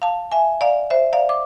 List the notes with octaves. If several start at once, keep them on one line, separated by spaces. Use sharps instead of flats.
F5 A5
E5 G#5
D5 F5
C5 E5
D5 F5
D6